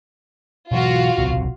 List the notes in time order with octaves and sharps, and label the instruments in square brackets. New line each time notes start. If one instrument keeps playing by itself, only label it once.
[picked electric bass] B2 E3 F#3 [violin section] F4 F#4 F5
[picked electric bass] D1 B1 C3